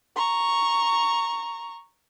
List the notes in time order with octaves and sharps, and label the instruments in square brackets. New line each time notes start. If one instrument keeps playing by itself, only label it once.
[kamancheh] A#5 C#6